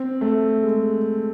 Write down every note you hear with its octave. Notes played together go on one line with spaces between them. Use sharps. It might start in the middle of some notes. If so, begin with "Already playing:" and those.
Already playing: C4
A3
G#3